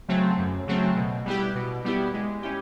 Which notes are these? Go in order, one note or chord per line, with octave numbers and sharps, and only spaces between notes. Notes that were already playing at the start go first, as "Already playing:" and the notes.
C#3 F#3 A3 C4
F#2
C#3 F#3 A3 C4
B2
G3 B3 E4 G4
B2
G3 B3 E4 G4
G#3
C#4 E4 G4